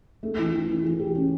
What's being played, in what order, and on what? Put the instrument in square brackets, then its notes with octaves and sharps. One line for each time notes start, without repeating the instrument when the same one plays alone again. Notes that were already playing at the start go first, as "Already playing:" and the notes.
[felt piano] A3
E3
E3
E3
E3
G4
C#4